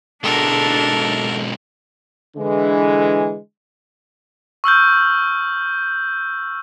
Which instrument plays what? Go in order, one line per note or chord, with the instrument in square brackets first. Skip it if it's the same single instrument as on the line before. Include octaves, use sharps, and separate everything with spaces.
[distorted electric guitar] B1 G#3 [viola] D4 [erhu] A4 [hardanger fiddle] A#4
[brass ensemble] D3 E3 G#3
[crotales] C#6 E6 F6 G6